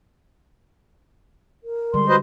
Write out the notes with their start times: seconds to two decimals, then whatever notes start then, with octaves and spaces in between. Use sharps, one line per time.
1.64 A#4
1.94 D3 G3 G#3 C6
2.09 F#4 B4 C5 D#5